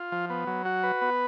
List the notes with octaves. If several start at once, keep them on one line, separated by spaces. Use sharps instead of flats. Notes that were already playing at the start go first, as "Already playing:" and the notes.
Already playing: F4
F3
B3
F#3
F#4
B4
B3